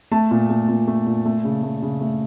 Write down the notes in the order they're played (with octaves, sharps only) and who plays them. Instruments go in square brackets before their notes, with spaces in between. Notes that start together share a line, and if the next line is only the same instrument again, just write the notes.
[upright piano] A3 A5
A#2
A3
A#2
A3
A#2
A3
C#3
A3
C#3
A3